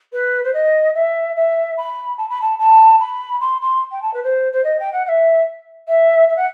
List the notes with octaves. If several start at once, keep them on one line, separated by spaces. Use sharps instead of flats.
B4
C5
D#5
E5
E5
B5
A5
B5
A5
A5
B5
C6
C6
G5
A5
B4
C5
C5
D#5
G5
F#5
F#5
E5
E5
E5
F#5